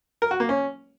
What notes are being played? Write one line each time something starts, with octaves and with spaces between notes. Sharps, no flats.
A#4
F#4
A#3
C#4